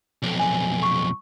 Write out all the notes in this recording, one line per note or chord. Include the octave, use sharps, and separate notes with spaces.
B1 F2
G#5
C#6